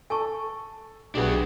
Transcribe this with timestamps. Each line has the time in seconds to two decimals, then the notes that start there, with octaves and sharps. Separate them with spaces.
0.10 A4 G#5 A5 C#6
1.15 B1 G3 D4 F#4 G#4 B4